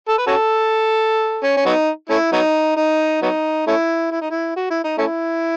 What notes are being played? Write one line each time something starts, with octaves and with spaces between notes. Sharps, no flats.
A4
B4
C#4 F#4 A4
C#4
C#4
F#3 B3 D#4
A3 C#4 E4
F#3 B3 D#4
D#4
F#3 B3 D#4
A3 C#4 E4
E4
D#4
E4
F#4
E4
D#4
A3 C#4 E4